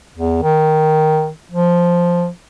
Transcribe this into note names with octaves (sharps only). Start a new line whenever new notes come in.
E2
D#3
F3